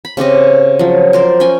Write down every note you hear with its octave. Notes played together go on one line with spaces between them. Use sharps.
B5
C#3 C4 G4 D#5
F3 F#3
A#4 C5 D5
C#4 G5 G#5